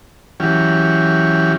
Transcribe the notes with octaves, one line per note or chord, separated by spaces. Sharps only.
E3 F#3 C#4 G4 F6